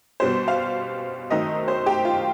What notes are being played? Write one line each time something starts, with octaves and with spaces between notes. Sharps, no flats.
B2 G3 B3 C5
F5
D#3 F#3 A3 C4 D#4 D#5
C5
G4
F4